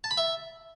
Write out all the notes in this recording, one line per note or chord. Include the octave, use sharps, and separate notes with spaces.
A5
B5
E5